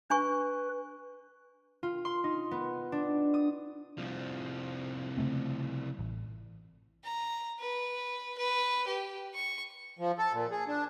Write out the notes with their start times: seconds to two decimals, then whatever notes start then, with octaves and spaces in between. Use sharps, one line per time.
0.10 D4 B4 G#5 C#6
1.83 F4
2.05 C6
2.24 D#4
2.51 B3
2.92 D4
3.34 D#6
3.98 C2 F3
5.18 C#3 A3 C4
5.99 A1
7.04 A#5
7.60 B4
8.38 B4
8.87 G4
9.34 C#6
9.98 F3
10.18 A4
10.33 A#2
10.51 G#4
10.68 D4